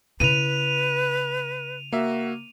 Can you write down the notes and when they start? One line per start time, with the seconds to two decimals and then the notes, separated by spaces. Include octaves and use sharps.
0.20 C#3 E4 B4 D#7 F7
1.92 A#3 F#4 E5